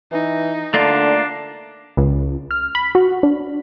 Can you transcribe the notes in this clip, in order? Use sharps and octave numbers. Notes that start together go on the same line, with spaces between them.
E3 D#4
D3 A3 A#3 D4 F4
C#2
F6
B5
F#4
D4